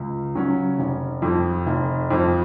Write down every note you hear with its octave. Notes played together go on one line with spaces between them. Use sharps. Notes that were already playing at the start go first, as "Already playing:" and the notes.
Already playing: C#2
C#3 F#3 C#4
F1
F2 F3
F1
F2 F3